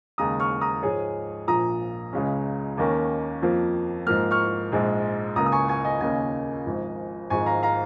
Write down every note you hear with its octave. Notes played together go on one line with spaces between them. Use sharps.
D#2 C#3 G#3 A#5 D#6
C#6 F6
A#5 D#6
G#2 F3 G#3 G#4 C#5
A#1 A#2 F3 A#5 D#6
C#2 C#3 G#3 C#4
D#2 D#3 A#3 C#4
F2 F3 A#3
G#2 F3 A#3 F6
C#6 F6
A#1 G#2 G#3
C#2 C#3 A#3 A#5 D#6
D#6
G#5 C#6
G#5 C#6
D#5 G#5
D#2 C#3 A#3 C#4 D#5 G#5
G#1 G#2 F3
G#1 G#2 F3 G#3 G#5 C#6
F5 A#5
F5 A#5